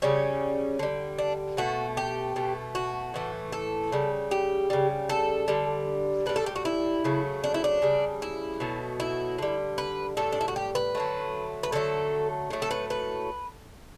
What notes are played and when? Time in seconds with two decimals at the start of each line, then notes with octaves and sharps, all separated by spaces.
0.02 C#3 G3 C#4
0.79 D3 G3
1.18 D4
1.57 B2 A3 F#4
1.97 G4
2.36 B2 A3
2.75 F#4
3.14 A2 E3 A3
3.52 A4
3.92 C#3 G3
4.31 G4
4.70 C#3 G3
5.10 A4
5.48 D3 G3
6.26 A2 G3 B4
6.36 A4
6.46 G4
6.56 F#4
6.65 E4
7.04 C#3 F#3 A3
7.44 D4
7.54 E4
7.64 D4
7.82 C#3 G3
8.22 E4
8.60 B2 F#3 A3
9.00 E4
9.38 D3 G3
9.78 B4
10.17 A2 G3 A4
10.32 D4
10.41 E4
10.48 F#4
10.56 G4
10.75 B4
10.95 D3 F#3 A3
11.63 B4
11.72 D3 F#3 A3 A4
12.50 A2 F#3 A3
12.62 A4
12.71 B4
12.90 B4